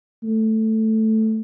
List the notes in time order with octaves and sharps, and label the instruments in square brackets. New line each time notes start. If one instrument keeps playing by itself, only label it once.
[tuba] A3